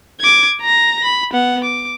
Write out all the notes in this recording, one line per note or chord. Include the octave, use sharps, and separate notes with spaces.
D6 G#6
A#5 A#6
B5
B3 F#5
D6